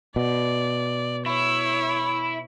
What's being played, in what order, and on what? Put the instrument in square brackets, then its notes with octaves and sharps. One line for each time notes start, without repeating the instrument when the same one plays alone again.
[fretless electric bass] B2 [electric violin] D5
[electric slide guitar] E4 [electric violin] C#5 E6